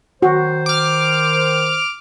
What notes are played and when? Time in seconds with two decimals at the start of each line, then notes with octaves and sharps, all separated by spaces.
0.22 D#3 F#4 C5
0.66 D6 F6